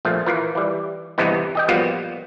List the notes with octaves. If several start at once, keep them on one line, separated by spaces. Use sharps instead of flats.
A#1 F3 A3
E3 F4 A#4
E3 G3
E2 G2 C3 E3 B3 D#4
G4 D#5 G5
F3 G3 A#3 B3 F4 F#4